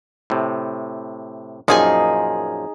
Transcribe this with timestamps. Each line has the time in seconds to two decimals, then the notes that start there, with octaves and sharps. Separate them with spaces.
0.30 A2 C3
1.68 F#2 A#2 F3 D#4 G#4 G#5